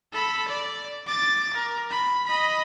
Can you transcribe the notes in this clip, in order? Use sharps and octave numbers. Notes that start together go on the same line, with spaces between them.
A4 B5
D5
D6 A6
A#4
B5
D#5 B5